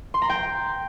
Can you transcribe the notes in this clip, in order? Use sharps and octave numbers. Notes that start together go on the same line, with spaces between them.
C6
A#5
G5